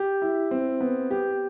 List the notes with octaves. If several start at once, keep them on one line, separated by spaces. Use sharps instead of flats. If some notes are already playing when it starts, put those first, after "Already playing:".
Already playing: G4
E4
C4
B3
G4